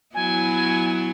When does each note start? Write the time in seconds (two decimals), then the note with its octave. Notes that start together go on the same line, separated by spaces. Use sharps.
0.15 F#3 B3 E4 G#5